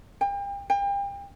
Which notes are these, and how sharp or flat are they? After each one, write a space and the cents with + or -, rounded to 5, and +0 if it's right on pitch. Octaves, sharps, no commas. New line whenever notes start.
G5 +35
G5 +35